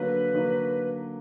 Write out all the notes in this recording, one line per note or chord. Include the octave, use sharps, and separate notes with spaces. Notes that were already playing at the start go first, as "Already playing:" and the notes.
Already playing: D3 F#3 A#3 B4
D3 F#3 A#3